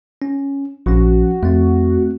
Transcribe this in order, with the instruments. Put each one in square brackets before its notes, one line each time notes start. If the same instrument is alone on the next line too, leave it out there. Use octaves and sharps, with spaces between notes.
[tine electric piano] C#4
[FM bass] A#1 [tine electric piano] F3 C#4 [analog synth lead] F#4
[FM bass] F2 [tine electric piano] A3 C4